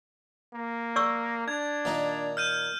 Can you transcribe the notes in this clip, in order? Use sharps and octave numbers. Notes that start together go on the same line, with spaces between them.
A#3
D5 C#6 E6
D4 G#6
A#2 D#3 D#4
F6 G6 D#7